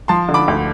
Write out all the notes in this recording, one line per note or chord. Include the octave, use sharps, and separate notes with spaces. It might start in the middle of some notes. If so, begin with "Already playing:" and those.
F3 A5 C6
D3
B5 D6
D2